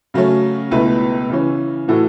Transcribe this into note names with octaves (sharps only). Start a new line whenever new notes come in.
C#3 F#3 A3 C#4
C#2 B2 A3 E4 B4
C#3 E3 C#4
A2 E3 A3 F#4 A4